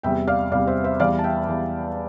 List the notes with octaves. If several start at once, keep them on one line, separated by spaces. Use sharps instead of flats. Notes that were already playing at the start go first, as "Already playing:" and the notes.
E2 C3 G3 E5 G5
D5 F5
E2 C3 G3 D5 F5
C5 E5
C5 E5
E2 E3 G3 D5 F5
A5
E5 G5
E2 E3 G3